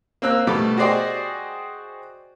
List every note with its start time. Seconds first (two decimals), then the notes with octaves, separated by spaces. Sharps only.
0.22 A#3 C4 E6 F#6
0.47 B2 G3 A3 D6
0.77 F#4 G#4 C5 D5 D#5 G5